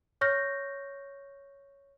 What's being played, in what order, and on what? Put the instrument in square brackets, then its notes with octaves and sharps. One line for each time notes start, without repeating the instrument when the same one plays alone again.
[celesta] C#5 C#6 F6 G6 A#6